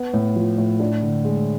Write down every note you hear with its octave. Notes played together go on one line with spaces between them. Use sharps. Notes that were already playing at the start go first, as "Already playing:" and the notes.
Already playing: B3
A2
F3
A2
D4
D3
G#3